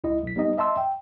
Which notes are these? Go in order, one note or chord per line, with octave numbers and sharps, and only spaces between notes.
C#2 E4 D#5
B1 B6
G3 B3 D#4 D#5
D#5 E5 A5 C6 E6
G5